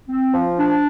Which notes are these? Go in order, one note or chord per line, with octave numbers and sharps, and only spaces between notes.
C4
F3
D4